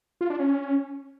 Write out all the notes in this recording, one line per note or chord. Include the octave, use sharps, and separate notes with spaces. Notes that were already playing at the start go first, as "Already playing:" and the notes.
F4
D4
C#4